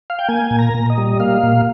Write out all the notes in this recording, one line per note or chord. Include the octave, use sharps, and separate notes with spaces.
F5
G5
A#3 G#5
A#2
A#5
A#2
D#5
G3
A#3 F5
A#2